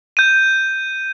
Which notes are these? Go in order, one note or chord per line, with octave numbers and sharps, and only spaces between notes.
G6 D#7